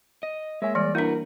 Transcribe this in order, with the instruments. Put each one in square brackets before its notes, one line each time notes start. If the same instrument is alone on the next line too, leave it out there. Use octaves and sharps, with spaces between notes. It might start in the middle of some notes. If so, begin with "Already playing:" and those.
[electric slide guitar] D#5
[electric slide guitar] G#3 [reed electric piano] A#3 C#5 G#5 [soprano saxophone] E5
[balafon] E3 G3 [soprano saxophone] D5
[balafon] A#3 D4 [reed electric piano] E4 [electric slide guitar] F#4 B4 [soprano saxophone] A#4